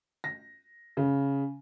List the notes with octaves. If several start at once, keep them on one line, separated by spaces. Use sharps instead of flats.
A#6
C#3